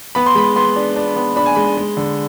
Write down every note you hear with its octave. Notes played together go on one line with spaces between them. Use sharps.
B3 B5
C6
G#3 B5
B3 C6
D4
D4
B3
D4 B5
G#5
G#3 B5
G#3
D3